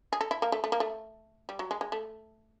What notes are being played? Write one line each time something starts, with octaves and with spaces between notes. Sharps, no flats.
G#4
A4
E4
A#3
A3
A3
A#3
A3
G3
F#3
G#3
G#3
A3